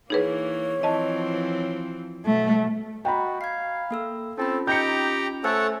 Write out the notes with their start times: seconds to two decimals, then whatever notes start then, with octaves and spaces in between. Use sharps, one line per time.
0.10 E3 A#3 D#4 G#4 B4 C#5
0.83 E3 F3 C4 D#5 A5
2.26 B2 F#3 A3
3.05 F#4 D#5 G5 A#5 B5
3.41 F5 G#6 C7
3.91 A#3 A4 E6
4.38 C4 C#4 F4 A4 B5
4.67 D#4 G4 G5 A#5 G6 C#7
5.44 A3 A4 C5 C#5 F#5 G#5 E6